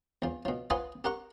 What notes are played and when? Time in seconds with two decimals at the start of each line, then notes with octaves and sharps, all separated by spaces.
0.22 E2 F3
0.45 B2 F3
0.70 F4 B4 C5 F#5 G#5 D#6
1.04 G4 A#4 F#5 C#6